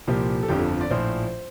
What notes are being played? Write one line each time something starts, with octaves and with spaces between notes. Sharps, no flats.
C2 A#2 F3 G4
A4
G1 F2 D3 F3 G4
A4
D5
A#1 A2 F3 C5